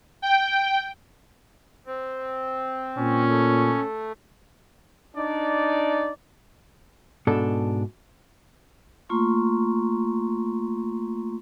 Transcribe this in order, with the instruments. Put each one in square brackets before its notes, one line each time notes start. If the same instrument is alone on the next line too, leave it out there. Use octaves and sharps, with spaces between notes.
[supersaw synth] G5
[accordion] C4
[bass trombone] A#2 [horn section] C#4
[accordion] A3
[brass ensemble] D4 D#4 D5
[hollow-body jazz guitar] G#2 B2 D4 A4
[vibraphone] A3 A#3 F4 A#5 C6 C#6